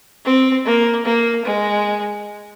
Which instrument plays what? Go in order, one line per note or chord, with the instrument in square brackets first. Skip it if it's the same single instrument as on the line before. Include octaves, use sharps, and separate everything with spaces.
[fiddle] C4
A#3
A#3
G#3